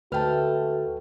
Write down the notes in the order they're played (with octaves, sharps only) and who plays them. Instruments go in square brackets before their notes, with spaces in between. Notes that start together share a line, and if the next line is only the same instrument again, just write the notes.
[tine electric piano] D2 F6 [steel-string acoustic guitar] G#2 A3 [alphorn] F#4 [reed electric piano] B4 G5 A5